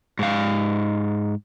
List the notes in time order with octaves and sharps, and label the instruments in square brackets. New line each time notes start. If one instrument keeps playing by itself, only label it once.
[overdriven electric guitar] G#2 F5